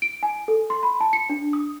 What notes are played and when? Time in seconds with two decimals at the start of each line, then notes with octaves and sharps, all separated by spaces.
0.02 D7
0.23 G#5
0.48 A4
0.70 C6
0.83 B5
1.00 A5
1.13 C#7
1.30 D4
1.53 D#6